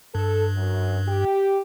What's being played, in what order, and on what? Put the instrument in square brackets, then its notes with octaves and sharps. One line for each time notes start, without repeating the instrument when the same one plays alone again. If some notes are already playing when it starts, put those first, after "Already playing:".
[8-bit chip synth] G2 [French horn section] A4
[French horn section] F#2
G4